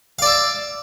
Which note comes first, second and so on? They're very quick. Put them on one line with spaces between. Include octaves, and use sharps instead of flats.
F5 D5 E5